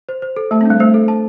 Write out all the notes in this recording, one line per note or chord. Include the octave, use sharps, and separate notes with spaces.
C5
C5
A4
A3 A5
C4
G3 D4
A3 C5
A4
A5